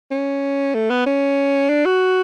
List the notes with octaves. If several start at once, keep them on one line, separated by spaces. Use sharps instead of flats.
C#4
A3
B3
C#4
D4
F#4